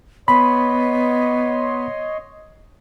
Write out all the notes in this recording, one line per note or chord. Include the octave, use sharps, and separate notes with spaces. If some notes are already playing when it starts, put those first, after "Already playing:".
B3 C#5 D#5 B5 C6